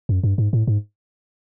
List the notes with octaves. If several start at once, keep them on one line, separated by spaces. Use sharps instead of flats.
F#2
G2
G#2
A2
G#2